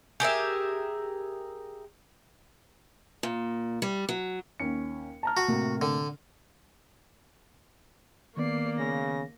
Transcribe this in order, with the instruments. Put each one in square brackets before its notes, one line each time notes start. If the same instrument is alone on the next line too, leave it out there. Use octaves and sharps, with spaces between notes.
[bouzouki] G4 G#4 A#4 E5
[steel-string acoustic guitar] A#2
G3
F#3
[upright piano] D#2 C#4 C#7
A5 A#5 F6
[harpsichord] F#4
[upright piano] A2 C3 A#3
[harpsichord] D3
[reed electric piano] D#3 B3 [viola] A#3 [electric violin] D5 C7
[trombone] C#3 [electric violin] A#6